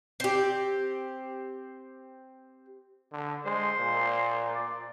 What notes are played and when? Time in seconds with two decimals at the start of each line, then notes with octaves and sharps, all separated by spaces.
0.20 C4 G4
3.12 D3
3.45 G#3 C5
3.79 A#2
4.54 D5